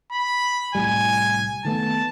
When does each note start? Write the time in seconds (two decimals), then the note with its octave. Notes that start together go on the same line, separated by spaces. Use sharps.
0.12 B5
0.75 C2 A2 G3 G#5
1.65 D#3 A3 B3 A5